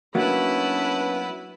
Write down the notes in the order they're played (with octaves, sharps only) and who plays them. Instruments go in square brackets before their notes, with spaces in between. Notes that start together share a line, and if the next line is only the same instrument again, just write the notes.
[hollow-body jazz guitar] F#3 A#3 B3 [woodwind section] C#4 D4 [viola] E4 B4